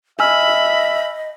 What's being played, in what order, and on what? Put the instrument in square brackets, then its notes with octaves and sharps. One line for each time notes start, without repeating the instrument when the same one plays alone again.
[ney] D#5 [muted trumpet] E5 [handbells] G#5 E6 F6 [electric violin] B5